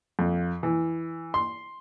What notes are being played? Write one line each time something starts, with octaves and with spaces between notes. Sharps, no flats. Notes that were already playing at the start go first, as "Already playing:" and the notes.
F2
E3
C6